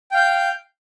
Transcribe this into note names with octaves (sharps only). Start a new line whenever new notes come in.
F5 G5 G6